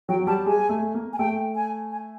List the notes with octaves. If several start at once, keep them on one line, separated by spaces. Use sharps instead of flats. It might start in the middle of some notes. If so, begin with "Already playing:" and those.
F#3 G5
G3 A5
G#3 G#5
A3
A#3
G#5
A3 G5
G#5
G#5